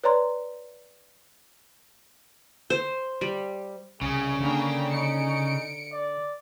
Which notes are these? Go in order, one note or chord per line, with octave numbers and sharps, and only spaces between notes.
B4 C#5 D5 A#5 C6
C5
G3
C2 C#3 G#4
D3 A#3 D4 G5
D#4 C#7 D7
D5